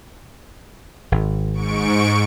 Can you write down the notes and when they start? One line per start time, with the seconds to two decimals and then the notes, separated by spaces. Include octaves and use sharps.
1.12 G#1
1.53 G#2 C#6 D7